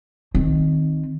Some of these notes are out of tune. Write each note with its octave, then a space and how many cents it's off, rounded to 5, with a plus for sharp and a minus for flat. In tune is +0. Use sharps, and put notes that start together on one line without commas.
D#3 +0 C4 +0